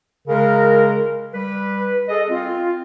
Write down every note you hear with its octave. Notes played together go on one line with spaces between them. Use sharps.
C#3 G#3 A#4
G3 B4
G#4 A4 D#5
C4 F4